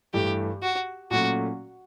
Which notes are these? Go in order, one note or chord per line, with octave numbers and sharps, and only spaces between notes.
G2 E3 A3 G4
F#4
A#2 F#3 A3 C#4 F#4